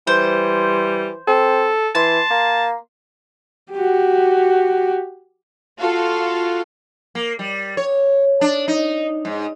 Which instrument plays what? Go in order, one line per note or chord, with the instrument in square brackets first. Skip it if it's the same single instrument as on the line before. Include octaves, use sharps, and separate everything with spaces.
[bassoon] E3 [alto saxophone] G3 [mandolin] C5
[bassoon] C4 [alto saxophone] A4
[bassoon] E3 [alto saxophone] A5 [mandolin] C6
[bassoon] A#3
[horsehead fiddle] F#4 G4
[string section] F4 F#4 A4 F5
[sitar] A#3
G3
C#5
D4
D#4
G#2